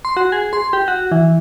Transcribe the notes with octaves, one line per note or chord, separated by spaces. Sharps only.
C6
F#4
G#4
C6
G4
F#4
E3